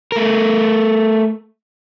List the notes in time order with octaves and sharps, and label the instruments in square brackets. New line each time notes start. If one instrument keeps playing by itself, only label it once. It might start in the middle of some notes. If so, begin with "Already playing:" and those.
[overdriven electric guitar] A3 A#4